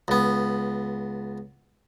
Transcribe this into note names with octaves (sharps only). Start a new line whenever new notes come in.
C#2 B3